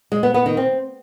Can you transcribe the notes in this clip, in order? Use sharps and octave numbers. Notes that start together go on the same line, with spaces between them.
G#3
B3
B3
D#3
C4